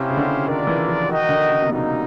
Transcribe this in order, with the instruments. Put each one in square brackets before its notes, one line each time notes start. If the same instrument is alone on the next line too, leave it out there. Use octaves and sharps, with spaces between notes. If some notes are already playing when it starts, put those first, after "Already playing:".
Already playing: [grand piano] C3 [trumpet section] C#4 E4 G4 C5 F5
[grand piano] C#3
D3
[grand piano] D#3 [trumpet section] D4 F4 A#4 D5
[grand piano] E3
F3
[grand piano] D#3 [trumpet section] F#4 A#4 D#5 G5
[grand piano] D3
C#3
C3
[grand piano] B2 [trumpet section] G3 A#3 D#4